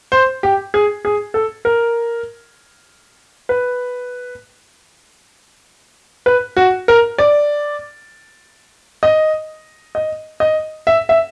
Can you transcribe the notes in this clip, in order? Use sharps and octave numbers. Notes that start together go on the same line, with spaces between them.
C5
G4
G#4
G#4
A4
A#4
B4
B4
F#4
A#4
D5
D#5
D#5
D#5
E5
E5